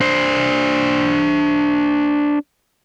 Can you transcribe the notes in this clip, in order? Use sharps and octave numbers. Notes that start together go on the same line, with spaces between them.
D4 C5